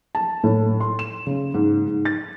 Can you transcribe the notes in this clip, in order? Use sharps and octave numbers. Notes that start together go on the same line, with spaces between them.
A5
A2
C6
E7
C#3
G#2
G#2
A6